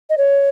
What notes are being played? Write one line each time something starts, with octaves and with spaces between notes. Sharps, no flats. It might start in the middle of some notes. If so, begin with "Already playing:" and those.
D#5
C#5